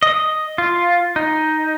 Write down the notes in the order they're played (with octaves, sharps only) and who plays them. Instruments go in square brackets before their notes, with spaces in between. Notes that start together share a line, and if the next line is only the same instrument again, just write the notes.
[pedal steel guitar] D#5
F4
D#4